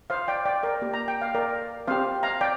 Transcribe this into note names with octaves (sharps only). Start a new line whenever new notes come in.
C5 F5
D5 G5
D5 G5
A#4 D5
A#3 G4
A#5
G5
F5
A#4 D5
C4 G4 C5 F5
F5 A#5
D5 G5